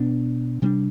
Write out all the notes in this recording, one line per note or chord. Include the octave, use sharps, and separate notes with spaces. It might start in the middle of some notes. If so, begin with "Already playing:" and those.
Already playing: B2 B3 D4
C3 G3 B3 D4